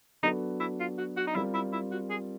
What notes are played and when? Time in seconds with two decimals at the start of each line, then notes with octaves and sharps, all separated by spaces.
0.23 F#3 B3 D4 D#4 F#4 A4
0.60 E4
0.80 F4
0.98 F#4
1.17 F#4
1.27 D#4
1.35 G3 C4 E4 F4 A#4
1.54 E4
1.73 E4
1.92 F#4
2.10 G#4